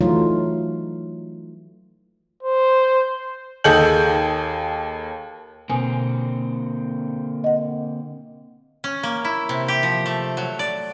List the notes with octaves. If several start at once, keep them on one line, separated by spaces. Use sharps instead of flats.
E3 F#3 A3 D#4 F4
C5
D#2 G#4 A4 D#5 G6 F#7
B2 D3 A#3 C4 G#5
D#5 F#5
C#4
A#3
E4
C3
G4
F3
A3
F#3
D5